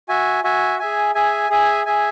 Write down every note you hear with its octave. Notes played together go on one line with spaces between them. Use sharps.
F#4 E5 G#5
F#4 E5 G#5
G#4 E5 G#5
G#4 E5 G#5
G#4 E5 G#5
G#4 E5 G#5